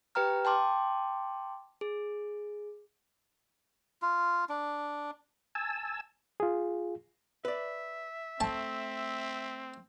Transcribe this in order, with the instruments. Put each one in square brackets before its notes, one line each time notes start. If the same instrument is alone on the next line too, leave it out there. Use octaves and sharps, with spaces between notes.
[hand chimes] G4 B4 G5 A#5 F6
G5 A5 C6 D6
G#4
[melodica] F4
D4
[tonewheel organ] G#5 A5 E6
[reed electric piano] F4 G#4
[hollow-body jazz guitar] B4 D5 [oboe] E5
[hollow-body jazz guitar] A3 [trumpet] C4 [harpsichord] A5